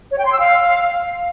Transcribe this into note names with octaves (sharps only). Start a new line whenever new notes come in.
C#5
G5
C6
E6
F5